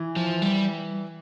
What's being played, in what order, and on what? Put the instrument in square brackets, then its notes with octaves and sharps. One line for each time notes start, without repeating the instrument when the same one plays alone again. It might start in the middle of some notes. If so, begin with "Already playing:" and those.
Already playing: [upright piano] E3
[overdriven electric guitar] F3
G3